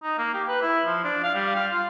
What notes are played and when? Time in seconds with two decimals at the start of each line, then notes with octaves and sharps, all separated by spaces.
0.03 D#4
0.18 A#3
0.34 G4
0.48 B4
0.62 E4
0.86 F3
1.04 D4
1.23 F5
1.35 G3
1.56 F5
1.72 F4